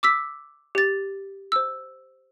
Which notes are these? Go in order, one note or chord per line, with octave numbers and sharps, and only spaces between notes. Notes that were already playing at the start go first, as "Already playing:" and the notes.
D6 E6 B6
G4 A6
C5 E6